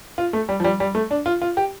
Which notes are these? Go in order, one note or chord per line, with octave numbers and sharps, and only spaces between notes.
F4
A3
G3
F3
G3
G3
A3
D4
F4
F4
G4